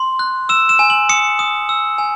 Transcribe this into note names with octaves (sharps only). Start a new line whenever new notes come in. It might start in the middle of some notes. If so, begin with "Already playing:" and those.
Already playing: C6
F#6
E6 E7
E7
G#5
F#7
D#6 C#7
D#6
E6
G#5